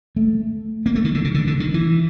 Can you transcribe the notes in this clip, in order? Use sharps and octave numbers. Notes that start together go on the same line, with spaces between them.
A3
A#3
A3
D#3
D3
C#3
D3
D3
D#3
E3